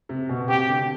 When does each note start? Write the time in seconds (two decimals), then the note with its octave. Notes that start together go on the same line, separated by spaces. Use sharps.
0.09 C3
0.29 B2
0.48 C3 G4
0.68 D3